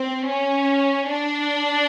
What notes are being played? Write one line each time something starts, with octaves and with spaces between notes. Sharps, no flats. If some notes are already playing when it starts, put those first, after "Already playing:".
Already playing: C4
C#4
D4